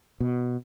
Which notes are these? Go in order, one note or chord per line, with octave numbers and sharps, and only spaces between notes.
B2